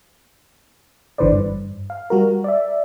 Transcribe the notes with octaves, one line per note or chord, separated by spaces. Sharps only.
G#1 D3 E3 B4 C5 D5
G2
F5
G3 F#4 A#4
D5 E5